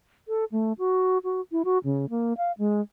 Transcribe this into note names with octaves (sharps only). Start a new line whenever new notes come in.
A4
A3
F#4
F#4
E4
F#4
C#3
A#3
F5
G#3